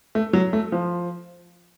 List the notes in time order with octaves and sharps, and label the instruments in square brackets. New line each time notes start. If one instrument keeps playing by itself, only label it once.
[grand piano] A3
F#3
A3
F3